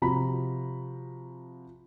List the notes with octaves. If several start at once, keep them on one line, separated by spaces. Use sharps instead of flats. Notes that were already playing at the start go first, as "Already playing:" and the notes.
C3 F3 F#4 A#5 B5